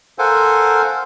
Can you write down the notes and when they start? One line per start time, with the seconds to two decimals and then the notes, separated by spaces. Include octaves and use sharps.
0.19 A4 A#4 C5 F5 F#5 G#5